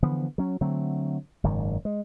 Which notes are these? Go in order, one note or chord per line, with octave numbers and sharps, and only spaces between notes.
D3 E3 F3 B3
F#3 C#4
D3 F#3 A3 C4
F#1 G#2 D#3
G#3